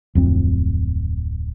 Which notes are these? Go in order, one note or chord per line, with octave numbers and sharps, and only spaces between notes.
D1 F2 C4